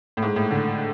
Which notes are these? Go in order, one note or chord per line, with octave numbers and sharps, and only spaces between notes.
A2
G#2
A2
D3